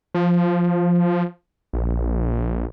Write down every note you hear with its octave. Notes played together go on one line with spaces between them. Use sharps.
F3
A#1